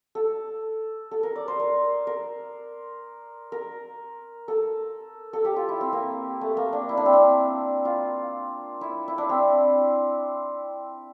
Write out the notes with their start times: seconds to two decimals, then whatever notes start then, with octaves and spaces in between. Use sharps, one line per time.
0.15 A4
1.11 A4
1.23 A#4
1.36 D5
1.48 C5
1.60 A#4
2.07 A#4
3.52 A#4
4.48 A4
5.33 A4
5.45 G4
5.56 F4
5.69 E4
5.81 C4
5.93 A#3
6.41 A3
6.57 A#3
6.73 D4
6.89 E4
6.97 D4
7.06 C4
7.13 D4
7.85 F4
8.81 E4
9.08 E4
9.18 D4
9.29 C4